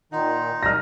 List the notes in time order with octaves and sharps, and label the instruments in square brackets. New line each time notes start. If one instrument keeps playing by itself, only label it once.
[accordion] A#2 D#3 [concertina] D#4 [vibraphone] F#5 A#5 C6
[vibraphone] F#3 A#4 D#5 [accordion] G3 A5 [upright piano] F6 A#6